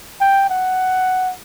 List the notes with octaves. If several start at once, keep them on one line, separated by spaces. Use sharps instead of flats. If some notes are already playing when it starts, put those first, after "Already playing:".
G5
F#5